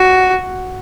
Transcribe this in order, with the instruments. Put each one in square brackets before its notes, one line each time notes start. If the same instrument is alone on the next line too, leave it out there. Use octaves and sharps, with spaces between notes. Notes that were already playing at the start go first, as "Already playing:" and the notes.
Already playing: [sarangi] F#4